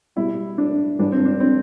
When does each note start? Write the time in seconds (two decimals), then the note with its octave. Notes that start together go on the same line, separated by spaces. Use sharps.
0.16 B2 G3 E4
0.58 D4
0.99 G2 E3 G3 D4
1.12 C4
1.25 D4
1.40 C4